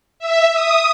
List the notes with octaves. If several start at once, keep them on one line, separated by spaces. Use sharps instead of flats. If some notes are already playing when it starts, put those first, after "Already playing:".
E5
D#6